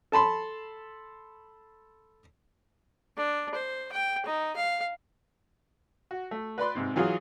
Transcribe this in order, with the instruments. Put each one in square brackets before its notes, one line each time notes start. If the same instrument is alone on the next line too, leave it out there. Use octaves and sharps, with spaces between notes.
[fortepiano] A4 A5 B5 C6
[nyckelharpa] D4
C5
G5
D#4
F5
[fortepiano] F#4
A3
B4 D5 B5 C6
G#2 C3 C4
E3 F#3 F4 F#4 G#4